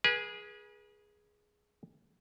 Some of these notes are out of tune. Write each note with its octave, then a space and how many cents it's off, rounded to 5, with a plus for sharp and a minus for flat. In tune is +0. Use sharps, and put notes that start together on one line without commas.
G#4 +0 B4 -40 G#5 +0